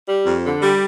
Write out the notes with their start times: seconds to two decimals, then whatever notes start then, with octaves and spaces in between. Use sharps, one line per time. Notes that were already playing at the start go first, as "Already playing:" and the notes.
0.08 G3
0.25 F2
0.44 D3
0.61 G3